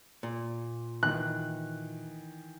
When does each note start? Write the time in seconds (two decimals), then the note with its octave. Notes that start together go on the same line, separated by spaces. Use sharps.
0.23 A#2
1.03 D#3 E3 F#6